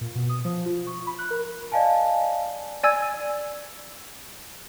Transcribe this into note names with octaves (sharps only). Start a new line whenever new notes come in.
A#2
B2
D#6
F3
F4
C#6
B5
F#6
A#4
D5 D#5 F5 G#5 A5
D5 G#5 E6 G#6